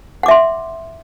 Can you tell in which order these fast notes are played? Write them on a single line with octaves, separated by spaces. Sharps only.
F#5 D6 E5 C6